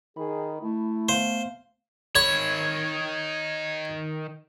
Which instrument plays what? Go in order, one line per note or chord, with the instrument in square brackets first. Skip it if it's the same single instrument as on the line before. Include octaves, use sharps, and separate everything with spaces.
[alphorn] D#3 [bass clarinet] G#4 [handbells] B5
[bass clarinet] A3 [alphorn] E4
[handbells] B3 F5 [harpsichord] C5
[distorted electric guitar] D#3 B5 [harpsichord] C#5 [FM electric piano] G#6